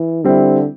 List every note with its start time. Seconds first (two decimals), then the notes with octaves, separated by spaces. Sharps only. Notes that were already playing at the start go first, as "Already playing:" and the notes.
Already playing: E3
0.24 D3 G3 C4 E4